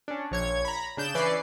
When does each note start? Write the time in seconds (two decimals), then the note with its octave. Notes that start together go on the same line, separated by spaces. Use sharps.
0.08 C#4 D4
0.31 A#1 C#5 G#6
0.65 A#5 B5
0.97 C#3 D4 G6 E7
1.14 E3 C#4 B4 D5 C7